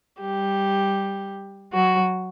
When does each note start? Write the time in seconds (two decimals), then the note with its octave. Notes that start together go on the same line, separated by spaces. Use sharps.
0.20 G3 G4
1.72 F#3 F#4